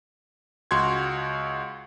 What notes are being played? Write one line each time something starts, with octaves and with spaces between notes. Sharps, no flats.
C#2 F#4 C6 G#6